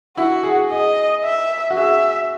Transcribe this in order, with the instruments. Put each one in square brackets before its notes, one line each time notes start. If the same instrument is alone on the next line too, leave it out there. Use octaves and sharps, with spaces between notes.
[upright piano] E4 [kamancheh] F#4
[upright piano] G#4
[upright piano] G#4 [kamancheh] D#5
[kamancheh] E5
[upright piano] F#4
[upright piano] G#4 [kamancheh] E5